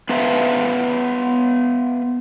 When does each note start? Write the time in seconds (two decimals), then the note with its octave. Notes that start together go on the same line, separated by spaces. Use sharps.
0.09 B3 B4 C5 E5 F5